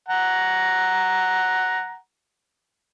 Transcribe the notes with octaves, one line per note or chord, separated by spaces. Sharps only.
F#5 A#5